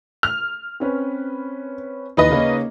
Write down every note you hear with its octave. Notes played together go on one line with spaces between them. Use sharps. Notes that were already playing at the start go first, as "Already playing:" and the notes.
F6
C4 C#4 B4
D#2 E3 D#4 B4 D#5
C#3 A#3 C#4